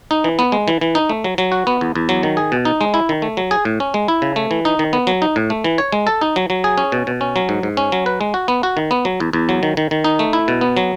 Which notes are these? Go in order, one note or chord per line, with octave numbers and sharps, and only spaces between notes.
D#4
E3
B3
G#3
E3
E3
D#4
A3
F#3
F#3
F#4
B3
E2
E2
F#3
D#3
G#4
B2
D#4
G#3
E4
D#3
A3
F#3
G#4
A2
C#4
G#3
E4
C#3
A3
E3
D#4
D#3
B3
F#3
D#4
A2
A3
E3
C#5
G#3
A4
D#4
F#3
F#3
G#4
C#4
B2
B2
C#4
F#3
G#2
G#2
C#4
F#3
B4
G#3
F#4
B3
F#4
D#3
B3
F#3
E2
E2
F#3
D#3
D#3
D#3
D#4
A3
E4
B2
B3
F#3